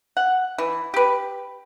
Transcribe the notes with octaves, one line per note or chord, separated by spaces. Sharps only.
F#5
E3
G4 B4